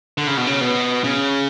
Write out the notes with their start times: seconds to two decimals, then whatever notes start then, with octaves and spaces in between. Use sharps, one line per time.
0.18 D3
0.27 C#3
0.37 B2
0.47 C#3
0.61 B2
1.04 C#3